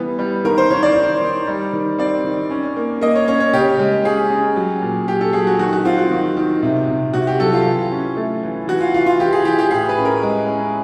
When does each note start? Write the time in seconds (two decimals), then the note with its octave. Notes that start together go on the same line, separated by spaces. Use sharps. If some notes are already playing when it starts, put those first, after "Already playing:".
Already playing: E3 G3 B3
0.19 G3
0.45 D#3 A#4
0.58 C5
0.70 D#3 C#5
0.83 D5
0.96 D#3
1.22 D#3
1.47 G3
1.73 D#3
1.98 C4 D5
2.24 D#3
2.50 C#4
2.77 A#3
3.01 A#3 D#5
3.15 C#5
3.28 C#4 C#5
3.40 C#5
3.53 C#3 G4
3.79 G#3
4.05 C#4 G#4
4.30 C#4
4.56 F#3
4.82 A#2
5.08 F#3 G4
5.21 A4
5.33 F#3 G#4
5.47 F#4
5.59 D#3 F#4
5.73 F#4
5.85 C4 F4
5.98 F#4
6.11 D#3
6.37 D#3
6.63 C3
6.88 C3
7.13 C3 F#4
7.27 G4
7.40 F#3 A4
7.53 F4
7.65 E3
7.92 C#4
8.17 A3
8.43 E3
8.68 E3 F#4
8.81 F4
8.94 E3 F4
9.06 F4
9.19 E3 G4
9.33 G#4
9.45 E3 G4
9.58 G4
9.71 A2 G#4
9.89 B4
9.98 C#4
10.05 A#4
10.23 G#3
10.48 C#4